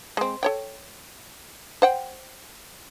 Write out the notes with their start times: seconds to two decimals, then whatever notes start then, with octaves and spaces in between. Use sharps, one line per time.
0.17 G#3 C4
0.43 A4 C#5 G5
1.82 C5 F#5 G5